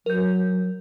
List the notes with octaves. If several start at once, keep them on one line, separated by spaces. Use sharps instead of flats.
F#3 A#4 G6